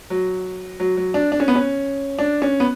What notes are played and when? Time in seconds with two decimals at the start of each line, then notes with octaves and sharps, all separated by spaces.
0.10 F#3
0.80 F#3
0.97 F#3
1.14 D4
1.32 D4
1.40 C#4
1.48 B3
1.55 C#4
2.19 D4
2.42 C#4
2.60 B3